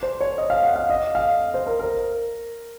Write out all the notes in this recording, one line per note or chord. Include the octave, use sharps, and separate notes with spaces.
C5
C#5
D#5
F5
F#5
F5
D#5
F5
C5
A#4
A#4